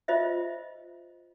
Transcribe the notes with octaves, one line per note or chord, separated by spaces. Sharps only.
F4 C5 D#5 E5